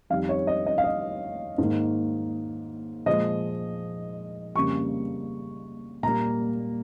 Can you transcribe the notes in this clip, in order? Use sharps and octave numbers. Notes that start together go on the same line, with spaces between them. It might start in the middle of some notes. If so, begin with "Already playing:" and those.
F2 D#3 G3 F5
C#5
D#5
D#5
F5
D#5
G#2 D#3 A#3
A#2 F3 G#3 D#5
F2 C#3 G3 A#3 C#6
A#2 G3 A#3 A#5